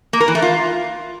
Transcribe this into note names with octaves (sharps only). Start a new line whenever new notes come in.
A#3
A#4
E3
A3
F4